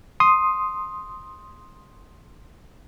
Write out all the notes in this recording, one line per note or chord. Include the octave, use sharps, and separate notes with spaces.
C6 D#6